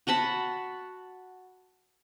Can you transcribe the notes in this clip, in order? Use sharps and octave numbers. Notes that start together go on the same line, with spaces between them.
F#4 F#5 A5 B5